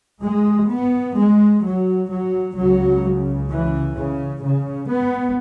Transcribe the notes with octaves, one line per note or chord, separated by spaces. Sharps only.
G#3
B3
G#3
F#3
F#3
C#2 C#3 F#3
E3
C#3
C#3
B3